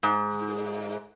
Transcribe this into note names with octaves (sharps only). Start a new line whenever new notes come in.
G#2